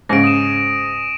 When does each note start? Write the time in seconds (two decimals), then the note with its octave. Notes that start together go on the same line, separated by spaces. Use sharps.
0.09 G#2 C#3 A#6 D7
0.24 D#6 D#7 E7